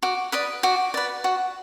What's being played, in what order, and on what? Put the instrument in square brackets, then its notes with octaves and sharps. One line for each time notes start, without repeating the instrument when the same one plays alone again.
[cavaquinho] F#4 D6
B4 D5 D#6
F#4 D6
B4 D5
F#4